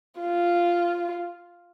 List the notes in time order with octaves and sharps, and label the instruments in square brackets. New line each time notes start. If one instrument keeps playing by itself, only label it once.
[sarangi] F4